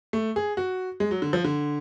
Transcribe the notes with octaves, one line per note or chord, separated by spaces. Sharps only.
A3
G#4
F#4
G#3
F#3
D3
F3
D3